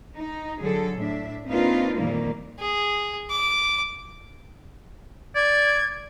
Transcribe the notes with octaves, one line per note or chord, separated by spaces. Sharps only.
D#4
D3 F#3 G#4 A4
A2 D4 E5
A#3 C4 D4 D#4 F4 B4
F2 A#2 D#3 E3 G3 A#3
G#4
D6
D5 G#6